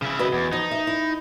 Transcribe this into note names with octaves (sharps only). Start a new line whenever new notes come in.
C#3 E4
F#4 B4 D#5
E2
F3 D#4
E5
E4